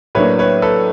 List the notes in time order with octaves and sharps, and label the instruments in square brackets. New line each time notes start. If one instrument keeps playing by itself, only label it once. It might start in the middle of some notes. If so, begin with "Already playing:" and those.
[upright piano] A2 F#3 A#3 D4 [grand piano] B4 C#5
[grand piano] B4 C#5
A4 B4